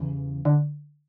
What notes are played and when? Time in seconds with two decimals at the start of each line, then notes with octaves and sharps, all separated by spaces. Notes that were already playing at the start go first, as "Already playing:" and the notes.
Already playing: E2 C#3 E3 G3
0.45 D3